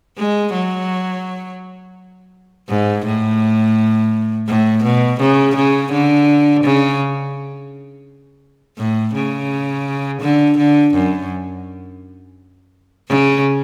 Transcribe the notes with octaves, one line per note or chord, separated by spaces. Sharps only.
G#3
F#3
G#2
A2
A2
B2
C#3
C#3
D3
C#3
A2
C#3
D3
D3
F#2
C#3